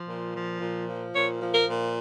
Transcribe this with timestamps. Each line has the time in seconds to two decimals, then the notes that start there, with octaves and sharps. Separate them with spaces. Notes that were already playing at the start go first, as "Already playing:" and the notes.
Already playing: F3
0.08 A#2
0.35 F3
0.61 A#2
0.88 F3
1.13 A#2 C#5
1.40 F3
1.53 A#4
1.67 A#2